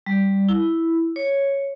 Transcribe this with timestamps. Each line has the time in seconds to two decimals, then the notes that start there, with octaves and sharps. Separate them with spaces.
0.06 G3
0.49 E4
1.16 C#5